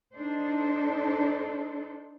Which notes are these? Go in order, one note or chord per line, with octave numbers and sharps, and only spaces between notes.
D4 D#4 A4 C5